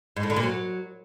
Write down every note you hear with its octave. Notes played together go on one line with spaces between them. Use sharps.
G#2
A2
D3
A#2
F#3